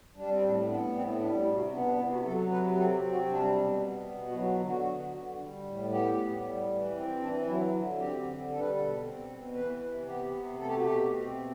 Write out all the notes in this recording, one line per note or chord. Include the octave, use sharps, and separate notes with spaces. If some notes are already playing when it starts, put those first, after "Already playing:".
G3 D4
C4
A2 D4
B3 D4
A2 C4
G3 D4
E4
C3
F#4
B3 D4
D4
C3 E4
F#4
F#3 A4
C3 B4
C4 A4
G4
C3
F#4
G3 D4
B2
B3
B2
F#4
F#3 E4
F#4
D3
F#4
B3
D3
G3
A2
B3 G4
A2
G3
E3
C4
E3 D4
F#3 E4
D3
C4 G4
D3
G3 A4
B4
A4
B2
C4
B2
E3 B4
C3
B3 G4
C3
A3 A4
G4
F#4
B2 G4
C4
B2